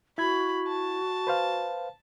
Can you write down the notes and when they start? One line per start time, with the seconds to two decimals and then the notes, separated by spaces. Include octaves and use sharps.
0.18 E4 F#4 B5 G#6
0.67 A5
1.27 B4 C5 F5